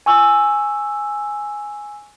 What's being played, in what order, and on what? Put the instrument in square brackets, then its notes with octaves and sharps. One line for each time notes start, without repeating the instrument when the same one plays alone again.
[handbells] G#5 C#6 E6